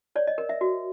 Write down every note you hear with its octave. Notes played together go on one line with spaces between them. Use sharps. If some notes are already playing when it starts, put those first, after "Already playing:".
C#5 D5
D#5
A#4
E5
F#4